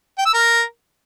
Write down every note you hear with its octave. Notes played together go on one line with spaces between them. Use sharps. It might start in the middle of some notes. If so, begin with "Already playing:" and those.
G5
E6
A#4